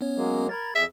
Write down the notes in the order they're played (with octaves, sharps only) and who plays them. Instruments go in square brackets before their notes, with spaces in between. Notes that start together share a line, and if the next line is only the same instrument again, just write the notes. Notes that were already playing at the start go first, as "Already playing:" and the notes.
[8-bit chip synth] B3 C#4 C#5
[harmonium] F#3 G#3 A#3
[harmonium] A#4 [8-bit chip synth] B5 G#6 A6
[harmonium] F2 G#4 [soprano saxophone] E5